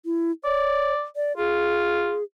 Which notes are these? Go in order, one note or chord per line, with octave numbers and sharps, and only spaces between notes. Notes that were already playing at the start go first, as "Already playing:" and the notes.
E4
C#5 D5
D5
F4 G#4